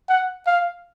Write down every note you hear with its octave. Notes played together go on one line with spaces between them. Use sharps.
F#5
F5